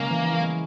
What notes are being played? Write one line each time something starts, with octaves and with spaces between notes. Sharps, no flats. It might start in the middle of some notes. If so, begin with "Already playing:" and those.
Already playing: C#3 G#3 A#3 C#4
E3
E4
G#3